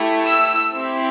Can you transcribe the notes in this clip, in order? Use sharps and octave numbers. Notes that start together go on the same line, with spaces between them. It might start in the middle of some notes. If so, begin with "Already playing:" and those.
Already playing: A3 E4 G4
E6
C4 E4 G4